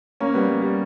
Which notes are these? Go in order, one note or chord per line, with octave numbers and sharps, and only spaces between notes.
A#3 C#4
G3 B3
G3
G3